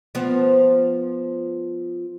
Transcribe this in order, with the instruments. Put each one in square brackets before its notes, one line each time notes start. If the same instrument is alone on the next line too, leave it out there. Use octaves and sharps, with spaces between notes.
[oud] F3 B3